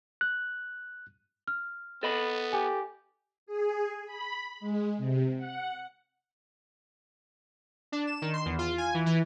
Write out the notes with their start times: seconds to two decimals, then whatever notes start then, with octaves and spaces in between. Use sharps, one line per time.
0.21 F#6
1.47 F6
2.03 B3 A4 D#5 B5
2.53 G4 G#5
3.46 G#4
4.06 B5
4.60 G#3
4.98 C3
5.38 F#5
7.92 D4
8.07 E7
8.22 D#3
8.33 C6
8.46 E2
8.59 F4
8.78 G#5
8.94 E3
9.06 E3